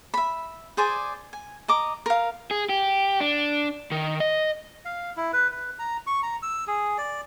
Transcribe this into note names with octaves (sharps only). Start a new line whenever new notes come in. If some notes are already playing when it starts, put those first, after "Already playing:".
E5 B5
G#4 C5 D5 G#5
G#5
D#5 A#5 D6
A#4 F5
G#4
G4
D4
D#3
D#5
F5
E4
B4
B4
A#5
C#6
A#5
E6
G#4
D5